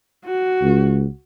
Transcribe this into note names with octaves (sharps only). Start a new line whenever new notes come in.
F#4
C#2